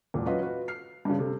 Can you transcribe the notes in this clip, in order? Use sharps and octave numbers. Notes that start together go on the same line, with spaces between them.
E1 A#2
F#3 C#4 F4 F#4 B4 D#5
F4 F#4 B4
F6 C7
G2 C#3
C3 A3